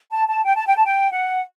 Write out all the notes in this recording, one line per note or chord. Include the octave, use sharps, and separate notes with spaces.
A5
A5
G5
A5
G5
A5
G5
F#5